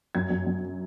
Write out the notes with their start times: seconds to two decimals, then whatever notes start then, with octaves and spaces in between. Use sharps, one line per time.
0.15 F#2 G#6
0.30 F#2
0.46 F#2